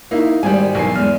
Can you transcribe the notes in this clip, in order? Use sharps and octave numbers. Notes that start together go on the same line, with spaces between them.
A#3 D#4 E4
G#1 G3 G#3 G#5
B1 E3 A#3 G#5 C7
E2 G#3 F6